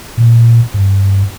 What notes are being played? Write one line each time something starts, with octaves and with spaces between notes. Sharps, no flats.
A#2
G2